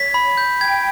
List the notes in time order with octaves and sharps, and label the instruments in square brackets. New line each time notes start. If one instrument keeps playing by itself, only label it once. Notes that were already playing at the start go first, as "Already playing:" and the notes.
Already playing: [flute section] C#5 [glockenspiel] B6
[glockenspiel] B5
G6
[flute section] G5 [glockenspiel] G#6